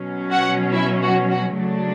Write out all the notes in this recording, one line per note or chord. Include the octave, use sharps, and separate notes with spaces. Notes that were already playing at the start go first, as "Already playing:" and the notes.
Already playing: B2 F#3 C#4
F#4 F#5
E4 E5
F#4
F#4
C#3 F#3 A3 D4